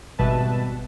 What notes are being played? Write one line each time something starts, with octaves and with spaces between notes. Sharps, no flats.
G#1 B2 G3 B4 E5 A5